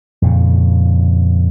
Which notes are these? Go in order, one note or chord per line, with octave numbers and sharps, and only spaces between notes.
F2 A#2 C#3